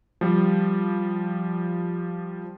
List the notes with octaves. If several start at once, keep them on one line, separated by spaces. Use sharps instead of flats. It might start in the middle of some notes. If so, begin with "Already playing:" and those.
F3 G3